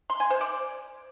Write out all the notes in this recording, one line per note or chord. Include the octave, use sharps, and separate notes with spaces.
C6
G#5
C5
D5